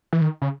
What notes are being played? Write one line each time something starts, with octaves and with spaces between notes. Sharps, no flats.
E3
D#3
C#3